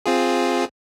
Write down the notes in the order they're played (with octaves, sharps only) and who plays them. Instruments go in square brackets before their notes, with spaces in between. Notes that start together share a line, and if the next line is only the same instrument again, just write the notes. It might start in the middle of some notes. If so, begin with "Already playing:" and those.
[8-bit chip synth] C4 F4 G#4